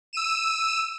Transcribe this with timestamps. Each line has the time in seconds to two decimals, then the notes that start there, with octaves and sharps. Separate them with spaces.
0.13 E6 D#7 E7